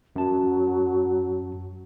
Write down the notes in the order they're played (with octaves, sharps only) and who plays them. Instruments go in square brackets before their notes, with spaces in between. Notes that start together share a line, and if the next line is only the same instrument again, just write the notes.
[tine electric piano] F#2 A5 [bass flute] F#3